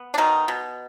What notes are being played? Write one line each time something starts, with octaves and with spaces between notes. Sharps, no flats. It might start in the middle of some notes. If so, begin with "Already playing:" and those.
Already playing: B3
D4
B2 D#3 D#4
B2